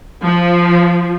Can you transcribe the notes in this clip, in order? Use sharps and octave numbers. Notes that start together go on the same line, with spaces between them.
F3